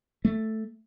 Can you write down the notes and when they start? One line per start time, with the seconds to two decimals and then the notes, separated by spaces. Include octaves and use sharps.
0.25 A3